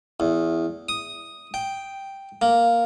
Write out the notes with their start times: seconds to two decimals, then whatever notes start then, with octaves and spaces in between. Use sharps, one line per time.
0.20 E2
0.89 D#6
1.54 G5
2.42 A#3